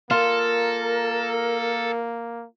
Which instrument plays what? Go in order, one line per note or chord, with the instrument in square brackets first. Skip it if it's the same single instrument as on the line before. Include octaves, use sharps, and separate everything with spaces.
[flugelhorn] A#3 [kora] F4 [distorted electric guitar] A4 [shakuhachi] A#4